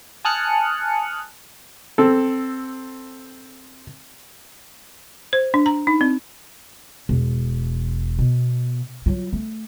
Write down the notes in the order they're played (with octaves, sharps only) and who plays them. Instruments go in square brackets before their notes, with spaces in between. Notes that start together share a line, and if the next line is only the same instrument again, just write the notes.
[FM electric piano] G#5 A5 D#6 F6 F#6 C#7
[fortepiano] C4 A4
[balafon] C5
D4
A#5
D#4
C4
[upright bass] E1
B2
F#3 F4
A3